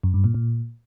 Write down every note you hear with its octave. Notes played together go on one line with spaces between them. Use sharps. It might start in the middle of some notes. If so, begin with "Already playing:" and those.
F#2
G2
A#2
A#2